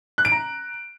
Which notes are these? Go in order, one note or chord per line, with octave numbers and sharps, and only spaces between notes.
F#6
D7
A#5